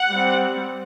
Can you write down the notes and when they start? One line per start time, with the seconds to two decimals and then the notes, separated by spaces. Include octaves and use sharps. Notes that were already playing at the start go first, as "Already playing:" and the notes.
Already playing: F#5
0.10 G3 C4